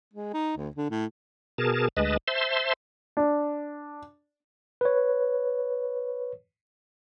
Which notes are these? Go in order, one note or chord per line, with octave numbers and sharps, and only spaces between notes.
G#3
D#4
D2
D3
A2
B2 G#4 A#4 A5
D2 G#3 B4 D#5 A5
C5 E5 A5 C6
D4
B4 C#5